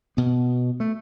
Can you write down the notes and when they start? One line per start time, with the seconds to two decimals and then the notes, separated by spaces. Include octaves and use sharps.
0.17 B2 B3
0.80 A3